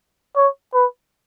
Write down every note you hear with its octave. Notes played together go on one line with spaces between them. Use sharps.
C#5
B4